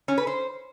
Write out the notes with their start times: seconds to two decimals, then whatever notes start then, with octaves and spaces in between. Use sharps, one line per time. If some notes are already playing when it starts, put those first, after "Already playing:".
0.08 C#4
0.18 B4
0.27 C5